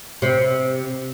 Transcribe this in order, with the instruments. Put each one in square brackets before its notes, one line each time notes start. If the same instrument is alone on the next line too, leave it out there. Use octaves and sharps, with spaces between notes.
[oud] C3